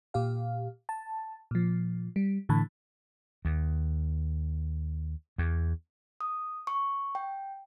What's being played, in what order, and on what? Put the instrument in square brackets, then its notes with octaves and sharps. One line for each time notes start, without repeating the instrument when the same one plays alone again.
[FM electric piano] A#2 G4 F5
A5
A#2 F3
G3
A2 D3 E3 A5 B5
[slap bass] D#2
E2
[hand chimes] D#6
C#6
G5